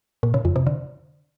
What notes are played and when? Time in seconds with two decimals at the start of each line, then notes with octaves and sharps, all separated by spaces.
0.23 A#2
0.34 C#3
0.45 F2
0.56 C3
0.67 D3